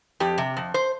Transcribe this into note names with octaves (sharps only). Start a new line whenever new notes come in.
F2 G4
C3
F2
C5